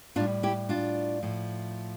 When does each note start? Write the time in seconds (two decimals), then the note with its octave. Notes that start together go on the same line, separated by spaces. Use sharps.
0.16 A2 D4 F4
0.20 G3
0.43 E4 G4
0.69 D4 F4
1.23 A2 F3 A3